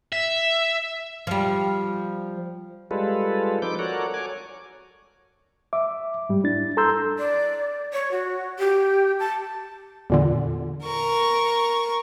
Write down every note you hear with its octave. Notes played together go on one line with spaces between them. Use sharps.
E5
F3 G3
G3 G#3 F4 A4 B4
F3 C4 D#4 D6 G6
F#4 A4 A#4 C#5 D5 F#5
C#5 G#5 D6
E5 D6
G#2 G3
D4 E4 A6
A4 A#5 C6 E6 G6
D5
C#5
F#4
G4
A5
E2 A#2 D3
A#4 C#6